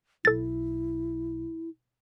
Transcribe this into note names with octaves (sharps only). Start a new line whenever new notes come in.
B1 E4 A4 A6